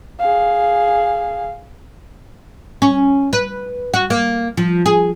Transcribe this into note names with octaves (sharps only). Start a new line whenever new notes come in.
G#4 F5
C#4
B4
F#4
A#3
F3
G#4